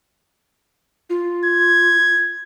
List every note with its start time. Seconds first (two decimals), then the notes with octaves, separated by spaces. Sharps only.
1.10 F4
1.45 G#6